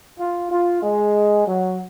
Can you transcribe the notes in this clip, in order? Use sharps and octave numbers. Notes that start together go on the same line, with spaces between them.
F4
F4
G#3
F#3